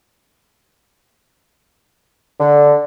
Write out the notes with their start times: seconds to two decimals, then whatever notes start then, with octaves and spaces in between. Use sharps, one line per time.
2.40 D3